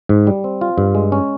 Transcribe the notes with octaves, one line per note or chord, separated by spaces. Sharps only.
G#2
G3
C4
F4
G2
G#3
C#4